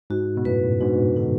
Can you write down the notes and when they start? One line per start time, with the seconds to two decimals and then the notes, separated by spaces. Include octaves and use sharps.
0.10 G#2 F#4
0.37 B2
0.45 F#2 A2 B4
0.81 G#2 B2 D4
1.16 B2 D3 D4